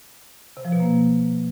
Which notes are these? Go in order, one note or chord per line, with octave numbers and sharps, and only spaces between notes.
C3
F3
B2
A#3